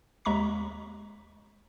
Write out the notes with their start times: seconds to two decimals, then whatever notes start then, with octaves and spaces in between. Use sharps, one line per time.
0.25 D#2 G#3 A#5 C#6 B6